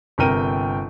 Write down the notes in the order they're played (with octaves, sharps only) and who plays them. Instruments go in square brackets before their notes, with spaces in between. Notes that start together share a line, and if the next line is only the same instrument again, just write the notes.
[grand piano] G1 C3 A#4 G5 D#7